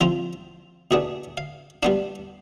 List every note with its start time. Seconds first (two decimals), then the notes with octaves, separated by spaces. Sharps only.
0.01 F3 C4 F4
0.91 B2 B3 D4 G#4
1.37 F5
1.83 G3 B3 D4 F5